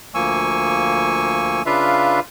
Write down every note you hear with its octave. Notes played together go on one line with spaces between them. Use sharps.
D2 F3 A#3 G#5 C#6 E6
C#3 D4 F4 B4 E5 F5